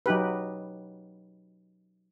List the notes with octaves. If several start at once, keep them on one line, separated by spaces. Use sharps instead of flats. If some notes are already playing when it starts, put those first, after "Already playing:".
F#3 D#4 G4 B4